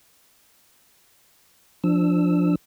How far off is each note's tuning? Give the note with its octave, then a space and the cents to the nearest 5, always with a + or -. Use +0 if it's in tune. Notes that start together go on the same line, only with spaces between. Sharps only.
F3 +0 D4 +0 E6 +0